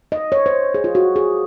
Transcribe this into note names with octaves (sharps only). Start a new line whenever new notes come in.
D#5
C#5
C5
G#4
F4
F#4
G#4